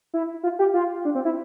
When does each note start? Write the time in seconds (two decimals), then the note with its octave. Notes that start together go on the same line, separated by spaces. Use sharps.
0.14 E4
0.43 F4
0.59 G4
0.74 F4
1.05 D4
1.15 C4
1.25 E4